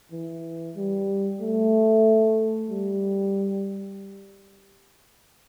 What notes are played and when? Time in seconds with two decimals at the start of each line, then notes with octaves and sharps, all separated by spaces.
0.12 E3
0.76 G3
1.41 A3
2.70 G3